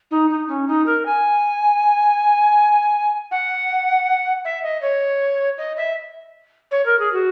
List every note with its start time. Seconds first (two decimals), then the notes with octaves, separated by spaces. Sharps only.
0.11 D#4
0.30 D#4
0.48 C#4
0.68 D#4
0.86 A#4
1.06 G#5
3.31 F#5
4.45 E5
4.63 D#5
4.82 C#5
5.58 D#5
5.77 E5
6.71 C#5
6.86 A#4
6.99 G#4
7.13 F#4